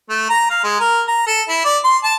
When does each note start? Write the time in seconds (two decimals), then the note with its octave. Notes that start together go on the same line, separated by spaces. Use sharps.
0.09 A3
0.29 A#5
0.50 F5
0.63 G#3
0.80 A#4
1.08 A#5
1.27 A4
1.49 E4
1.65 D5
1.84 C6
2.04 A5